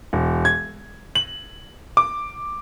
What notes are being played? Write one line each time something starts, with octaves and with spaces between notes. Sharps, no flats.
E1
G#6
F#7
D6